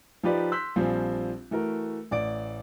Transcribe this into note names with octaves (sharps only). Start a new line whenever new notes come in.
F3 D#4 F4 G4 B4 D5
C6 E6 F#6 G6 B6
A#1 F3 G3 C4 G#5
E3 A3 F#4 A#4
A1 D5 D7